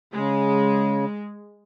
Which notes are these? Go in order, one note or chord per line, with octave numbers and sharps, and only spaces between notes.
C#3 G#3